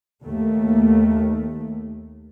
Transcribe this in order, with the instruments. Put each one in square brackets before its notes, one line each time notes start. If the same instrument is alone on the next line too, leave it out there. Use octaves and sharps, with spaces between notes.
[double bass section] D#2 A3